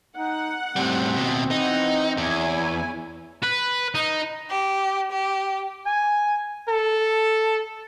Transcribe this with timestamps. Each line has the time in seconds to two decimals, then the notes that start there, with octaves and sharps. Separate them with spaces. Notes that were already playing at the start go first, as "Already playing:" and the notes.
0.16 D#4 F#5
0.76 A2 G3 C4
1.16 D#2 B2
1.51 E3 D#4 F#5
2.17 E2 E4 C#5 G#5
3.43 B4
3.95 D#4
4.51 G4
5.11 G4
5.86 G#5
6.69 A4